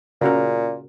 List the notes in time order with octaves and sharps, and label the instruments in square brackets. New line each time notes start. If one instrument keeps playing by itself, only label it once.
[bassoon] A#2 [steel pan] C#3 F#4 A#4